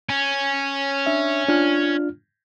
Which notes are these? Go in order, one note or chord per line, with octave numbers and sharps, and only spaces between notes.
C#4
D4 E5
D4 F4 F6